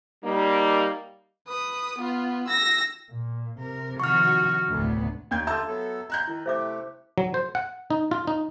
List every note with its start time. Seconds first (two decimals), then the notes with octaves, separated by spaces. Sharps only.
0.24 G3 A#3 D#4
1.48 B4 D#6
1.98 B3 F4
2.47 E6 A#6
3.10 A#2
3.60 C3 A#4
4.00 D#3 F3 F#4 C#6 F6
4.69 F1 D2 A2 B3
5.31 D#2 G6 G#6
5.47 D3 A#3 F4 E5 A5 E6 G6
5.68 F#3 B3 A4
6.10 F2 G#3 A#5 F#6 G6
6.28 D#3 E4
6.46 C3 A3 G4 C5 E5 D6
7.18 F#3
7.34 C5
7.55 F#5
7.90 D#4
8.11 F4
8.27 D#4